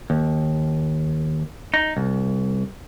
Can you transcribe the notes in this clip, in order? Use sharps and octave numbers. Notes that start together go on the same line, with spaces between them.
D#2
D#4
C2